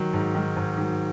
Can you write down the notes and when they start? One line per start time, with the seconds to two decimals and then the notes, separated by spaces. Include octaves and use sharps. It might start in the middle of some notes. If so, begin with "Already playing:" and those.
Already playing: D#3 F#3
0.13 G#2
0.35 D#3 F#3
0.56 G#2
0.78 D#3 F#3